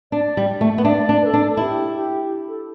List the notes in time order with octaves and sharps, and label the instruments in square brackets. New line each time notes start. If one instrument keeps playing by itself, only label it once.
[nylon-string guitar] D4 [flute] D5
[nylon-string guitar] G3
A3
B3
[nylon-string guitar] D4 [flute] E5
[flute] D5
[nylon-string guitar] D4
[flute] B4
A4
[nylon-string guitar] D4
[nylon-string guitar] E4 [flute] G4
[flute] G4
A4